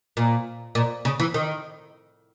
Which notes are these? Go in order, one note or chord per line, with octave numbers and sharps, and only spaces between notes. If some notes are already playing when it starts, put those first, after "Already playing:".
A#2
A#2
C#3
E3
D#3